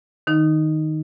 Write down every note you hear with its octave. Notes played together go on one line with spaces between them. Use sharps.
D#3 D#4